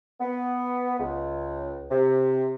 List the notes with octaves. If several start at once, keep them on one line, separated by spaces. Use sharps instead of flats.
B3
C#2
C3